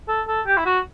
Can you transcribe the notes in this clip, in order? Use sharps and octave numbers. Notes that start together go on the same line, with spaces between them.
A4
A4
G4
E4
F#4